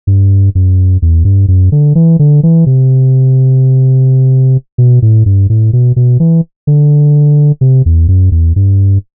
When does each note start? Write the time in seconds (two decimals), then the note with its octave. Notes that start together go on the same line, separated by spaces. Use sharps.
0.07 G2
0.55 F#2
1.02 E2
1.25 G2
1.48 F#2
1.72 D3
1.95 E3
2.19 D3
2.43 E3
2.66 C3
4.78 B2
5.02 A2
5.26 G2
5.50 A2
5.73 B2
5.96 B2
6.20 E3
6.67 D3
7.61 C3
7.86 E2
8.08 F#2
8.32 E2
8.56 G2